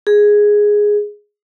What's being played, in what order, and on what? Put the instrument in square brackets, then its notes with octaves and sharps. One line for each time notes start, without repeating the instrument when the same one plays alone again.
[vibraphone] G#4